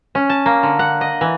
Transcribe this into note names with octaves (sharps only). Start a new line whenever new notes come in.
C#4
A5
A#3
D3
F#5
D#5
E3